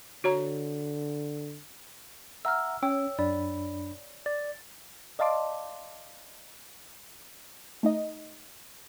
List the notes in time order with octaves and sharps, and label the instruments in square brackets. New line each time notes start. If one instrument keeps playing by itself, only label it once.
[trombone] D3 [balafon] F#4 C#5 A#5
[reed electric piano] E5 F#5 A#5 [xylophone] E6 F6
[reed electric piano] C#4 [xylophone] C#5 G5 E6
[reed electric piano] F#2 D4 B5 [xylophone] D5
[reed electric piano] D5 [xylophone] A6
[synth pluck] D5 D#5 F5 A5 C6 D6
[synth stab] A3 D#4 D#5